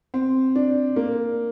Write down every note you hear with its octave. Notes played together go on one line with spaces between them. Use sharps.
C4
D4
A#3